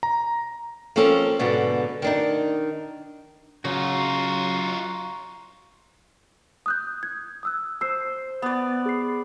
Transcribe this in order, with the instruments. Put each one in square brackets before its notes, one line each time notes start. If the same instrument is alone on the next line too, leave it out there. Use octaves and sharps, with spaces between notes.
[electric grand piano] A#5
[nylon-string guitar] F3 A#3 C4 C#4 A4
G#2 B2 D3
D#3 D4 D#4
[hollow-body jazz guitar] C#3 [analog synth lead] F#3 [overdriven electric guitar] F4 F#4 [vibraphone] A#5 C6 C#6
[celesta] D#6 F#6 G6
G#6
D#6 E6 F#6
[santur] C5 [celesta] E6 C7
[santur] B3 D5
[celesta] G#4 C7